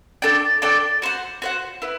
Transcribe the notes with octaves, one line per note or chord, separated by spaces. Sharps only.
D4 A4 D5 G5
D4 A4 D5 G5
F#4 C5 F#5
F#4 C5 F#5
E4 B4